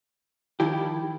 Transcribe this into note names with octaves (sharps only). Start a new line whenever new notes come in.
D#3 F3 E4 G4